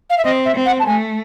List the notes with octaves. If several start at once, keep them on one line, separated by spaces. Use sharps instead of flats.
F5
E5
C4 D#5
E5
C4
F#5
A5
A3 G#5